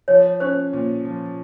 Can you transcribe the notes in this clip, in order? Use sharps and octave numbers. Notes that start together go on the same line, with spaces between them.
F3 C#5
C#4 C5
A#2
F3